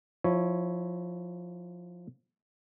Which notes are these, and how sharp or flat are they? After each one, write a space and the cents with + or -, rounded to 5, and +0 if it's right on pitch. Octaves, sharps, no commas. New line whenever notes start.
F3 +15 E4 +0 C#5 +0